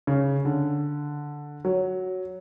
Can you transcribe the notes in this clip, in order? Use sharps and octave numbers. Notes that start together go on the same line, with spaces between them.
C#3
D3
F#3